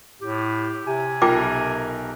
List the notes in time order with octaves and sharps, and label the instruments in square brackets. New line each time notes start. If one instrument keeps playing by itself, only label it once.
[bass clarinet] A2 [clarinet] G4
[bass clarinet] C3 [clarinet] G#5
[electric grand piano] B1 A#4 A5 [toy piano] F4 G5 D6